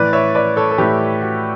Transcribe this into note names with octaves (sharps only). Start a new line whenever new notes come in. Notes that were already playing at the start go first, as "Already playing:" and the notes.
Already playing: A2 E3 B4 D5
C#5 E5
B4 D5
A4 C#5
A4
A2 E3 G4 B4
F#4